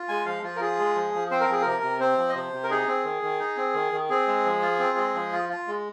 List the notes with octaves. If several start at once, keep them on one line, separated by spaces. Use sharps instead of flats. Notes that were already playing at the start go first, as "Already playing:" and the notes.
Already playing: F4
G#3 G#5
F3 F5
F3 F4
A#4
F4 G#4
G#3
F3
F3
C4 C5
A#4
F3 G#4
C3 A#4
C3
C4 C5
F3
D#5
C3 C5
C3
A#4
D#4 G#4
C4
D#3
D#3
D#4
C4
D#3
D#3
C4 G#4
G#3
F3
F4
C4
G#3
F3
F4
F4
G#3